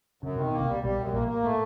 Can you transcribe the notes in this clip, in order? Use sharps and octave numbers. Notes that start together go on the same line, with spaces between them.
F#2 C#3
C3 D#3
B2 A#3
C2 C3
G3
B1 B2 G3
F#2
A#1 A#2 A#3
A#3
A2 A3